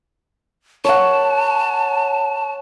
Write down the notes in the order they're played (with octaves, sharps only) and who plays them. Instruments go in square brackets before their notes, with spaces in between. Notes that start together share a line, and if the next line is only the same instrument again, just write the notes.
[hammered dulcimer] C#5 F#5 [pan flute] A5